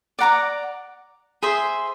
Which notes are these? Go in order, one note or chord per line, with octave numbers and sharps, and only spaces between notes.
D5 F#5 A#5 D6
G#4 C5 E5